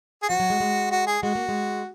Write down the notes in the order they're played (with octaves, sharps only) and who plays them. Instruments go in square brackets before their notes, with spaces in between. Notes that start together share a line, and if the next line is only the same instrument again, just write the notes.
[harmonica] G#4
[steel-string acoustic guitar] F3 [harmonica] F#4
[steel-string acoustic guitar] F#3
G#3
G#3
[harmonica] F#4
G#4
[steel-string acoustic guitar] G#3 [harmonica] F#4
[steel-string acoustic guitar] A#3
G#3